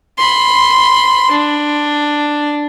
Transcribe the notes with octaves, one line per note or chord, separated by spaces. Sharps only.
B5 C6
D4